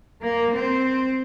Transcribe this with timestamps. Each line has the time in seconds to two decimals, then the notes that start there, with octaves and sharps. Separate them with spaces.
0.24 A#3
0.56 C4